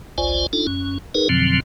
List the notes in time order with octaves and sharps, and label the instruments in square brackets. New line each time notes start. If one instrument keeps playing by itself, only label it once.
[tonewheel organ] G#1 C#2 F4 C5 D5 G#5
D4 D#4 F4 A4
F#2 C#4
D#4 G#4 A#4 B4
F2 B2 D3 F3 F#3 C4